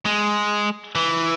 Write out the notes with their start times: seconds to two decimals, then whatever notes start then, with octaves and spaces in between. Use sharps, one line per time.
0.05 G#3
0.95 E3